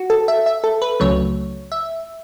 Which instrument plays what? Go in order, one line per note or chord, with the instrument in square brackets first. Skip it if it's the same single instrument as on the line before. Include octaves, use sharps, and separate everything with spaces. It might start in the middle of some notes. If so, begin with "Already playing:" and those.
Already playing: [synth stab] F#4
A4
E5
E5
A4
B4
C#2 C#3 F#3 A3 C#5
E5